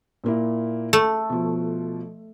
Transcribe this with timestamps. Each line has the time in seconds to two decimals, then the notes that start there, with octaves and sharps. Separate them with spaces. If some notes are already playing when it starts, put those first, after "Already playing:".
0.24 A#2 A#3 E4
0.93 A3
1.30 B2 F3